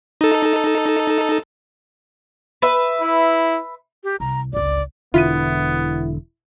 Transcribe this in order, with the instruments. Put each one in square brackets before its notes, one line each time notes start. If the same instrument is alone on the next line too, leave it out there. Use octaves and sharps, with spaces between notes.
[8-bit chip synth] D#4 A4
[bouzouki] B4 E5
[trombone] E4
[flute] G4
[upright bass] C2 [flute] A#5
[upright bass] G1 C#2 [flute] D5
[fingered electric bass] E1 D3 [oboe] B3 [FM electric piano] E4 [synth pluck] F4 B6 D#7